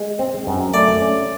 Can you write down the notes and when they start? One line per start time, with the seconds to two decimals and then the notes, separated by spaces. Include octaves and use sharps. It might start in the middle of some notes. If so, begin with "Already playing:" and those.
Already playing: G#3
0.19 C4
0.47 F#2
0.74 A3 D5
1.01 C#4